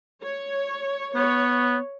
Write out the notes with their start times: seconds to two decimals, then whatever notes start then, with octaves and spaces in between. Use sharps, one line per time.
0.22 C#5
1.15 B3 C#5